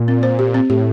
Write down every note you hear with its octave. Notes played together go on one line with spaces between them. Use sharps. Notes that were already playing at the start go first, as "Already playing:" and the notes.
Already playing: A#2
C4
C5
G4
C4
A2 G4